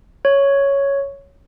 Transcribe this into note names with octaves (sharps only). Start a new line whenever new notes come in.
C#5